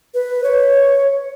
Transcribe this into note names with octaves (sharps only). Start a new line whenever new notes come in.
B4
C#5